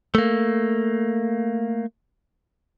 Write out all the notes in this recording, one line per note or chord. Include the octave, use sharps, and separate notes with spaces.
A3 A#3